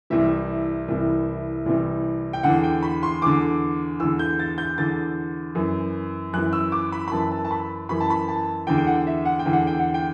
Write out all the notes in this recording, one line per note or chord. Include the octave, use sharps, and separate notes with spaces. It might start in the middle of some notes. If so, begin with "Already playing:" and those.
C2 C3 E3 E5
C2 C3 E3
C2 C3 E3
G5
E2 D3 F#5
G5
B5
C6
E2 D3 D6
E2 D3 E6
G6
A6
G6
E2 D3 A6
F#2 E3
F#2 E3 F#6
E6
D6
B5
B5
F#2 E3 A5
A5
A5
B5
F#2 E3 B5
A5
B5
A5
E2 D3 G5
G5
F#5
E5
F#5
G5
E2 D3
F#5
G5
F#5
G5